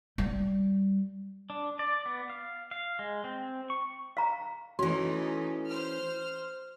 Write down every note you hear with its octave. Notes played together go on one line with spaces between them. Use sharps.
G3
D4
D5
B3
F5
F5
G#3
C4
C#6
F5 A#5
E3 A3 C#4 D#4 F#4
C5 F6